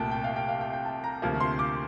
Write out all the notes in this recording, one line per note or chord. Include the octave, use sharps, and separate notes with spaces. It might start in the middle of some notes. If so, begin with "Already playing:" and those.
Already playing: C2 A#2 A3 G5 A5
G5
F5
G5
F5
G5
G5
A5
A#5
D2 C3 F3 A#3
C6
D6